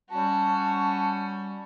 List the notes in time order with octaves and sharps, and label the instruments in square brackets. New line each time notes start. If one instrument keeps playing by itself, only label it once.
[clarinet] G3 [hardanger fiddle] C#4 F#4 [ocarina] A5